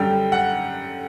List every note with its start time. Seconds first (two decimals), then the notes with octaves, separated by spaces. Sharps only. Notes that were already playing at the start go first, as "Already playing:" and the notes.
Already playing: F#2 D3 G3 G5
0.32 F#5